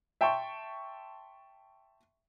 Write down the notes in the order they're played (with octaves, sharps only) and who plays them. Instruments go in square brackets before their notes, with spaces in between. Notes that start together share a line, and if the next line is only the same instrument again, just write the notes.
[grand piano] E5 G5 A5 C6 C#6